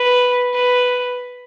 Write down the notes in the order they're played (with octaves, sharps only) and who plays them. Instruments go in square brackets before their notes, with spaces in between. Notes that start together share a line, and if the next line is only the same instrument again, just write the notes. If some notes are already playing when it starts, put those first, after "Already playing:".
Already playing: [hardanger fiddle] B4
B4